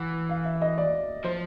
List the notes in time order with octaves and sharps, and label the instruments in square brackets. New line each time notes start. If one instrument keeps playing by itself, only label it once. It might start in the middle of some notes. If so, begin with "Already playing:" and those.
Already playing: [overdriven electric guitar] E3 [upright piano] F#5
[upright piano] F5
E5
D#5
D5
[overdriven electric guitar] F3 [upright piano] C5